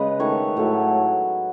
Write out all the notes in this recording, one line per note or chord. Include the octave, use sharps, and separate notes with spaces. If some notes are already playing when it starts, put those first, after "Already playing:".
Already playing: C#3 G#3 B4 D#5
D#3 A3 C#5
A2 F#3 A3